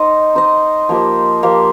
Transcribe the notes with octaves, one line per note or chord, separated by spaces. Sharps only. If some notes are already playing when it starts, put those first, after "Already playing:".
Already playing: D#4 C5 D#5
D#4 C5 D#5
F3 A#3 G4 C5
F3 A#3 G4 C5